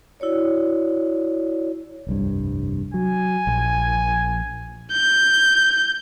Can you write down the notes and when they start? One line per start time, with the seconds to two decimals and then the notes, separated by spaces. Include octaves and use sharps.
0.20 E4 F#4 C#5 D5
2.07 F1 C2 G2
2.94 F#3 G#5
3.47 A#1
4.93 G6